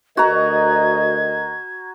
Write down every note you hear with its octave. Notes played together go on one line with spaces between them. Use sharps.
D2 F#4 A#4 D#5 A#5 G#6